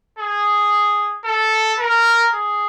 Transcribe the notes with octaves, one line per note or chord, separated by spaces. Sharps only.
G#4
A4
A#4
G#4